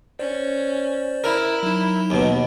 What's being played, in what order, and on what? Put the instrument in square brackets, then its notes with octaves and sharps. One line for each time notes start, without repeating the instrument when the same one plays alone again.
[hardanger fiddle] C#4 [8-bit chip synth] C5 D5
[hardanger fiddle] E4 [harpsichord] A#4
[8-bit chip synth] F#3 D#4
[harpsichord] D#2 B2